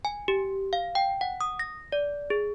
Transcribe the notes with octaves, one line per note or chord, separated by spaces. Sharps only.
G#5
G4
F5
G5
F#5
D#6
A#6
D5
G#4